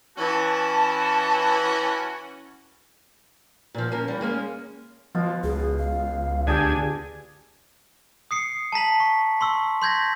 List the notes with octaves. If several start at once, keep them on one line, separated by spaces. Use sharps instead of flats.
E3 C#4 F#4 A5
A#2 F3
A#3 C#4 A#4
E3 G3
G#3 A#3 C#4
B2 F3 F4
C#2 G#4
F5
D2 D4 G4 G#4 G5 G#5
D#6 C7 C#7
A5 A#5 B6 F#7
C#6
C6 C#6 E6
C6 G6 G#6 A#6 B6